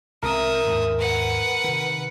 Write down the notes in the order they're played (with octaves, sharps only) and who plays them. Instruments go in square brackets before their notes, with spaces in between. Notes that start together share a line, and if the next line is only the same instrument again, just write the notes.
[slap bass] C2 G#3 C4 [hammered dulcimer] A#4 [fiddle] E5 D#6
[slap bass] D#2 G#2
[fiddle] B4 F#5
[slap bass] C3 D#3